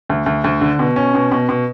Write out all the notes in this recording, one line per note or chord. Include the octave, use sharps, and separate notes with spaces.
D2
D2
D2
D3
B2
C#4
B2
B2
B2